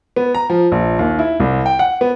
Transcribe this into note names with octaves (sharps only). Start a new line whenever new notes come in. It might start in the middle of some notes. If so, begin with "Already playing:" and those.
B3
A#5
F3
A#1
D#2
E4
C2
G5
F#5
B3